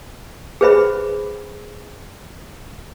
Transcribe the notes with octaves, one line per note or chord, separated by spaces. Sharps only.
G#4 B4 C5 E5 B5